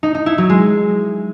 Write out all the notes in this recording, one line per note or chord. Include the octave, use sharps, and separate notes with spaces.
D#4
D#4
E4
F#3
G#3